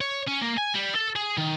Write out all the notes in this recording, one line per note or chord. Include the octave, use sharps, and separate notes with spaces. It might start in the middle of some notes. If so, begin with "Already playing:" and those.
C#5
C#4
A#3
G#5
G3
A4
G#4
D#3